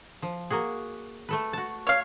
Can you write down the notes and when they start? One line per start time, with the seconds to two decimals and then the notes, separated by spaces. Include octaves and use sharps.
0.22 F3
0.50 A#3 F#4 G#4
1.29 A3 A4 B4
1.53 F#4 A5
1.87 C#5 F5